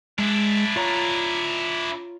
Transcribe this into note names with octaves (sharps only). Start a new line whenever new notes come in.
G#3 D4 E4
F4 C#5 A#5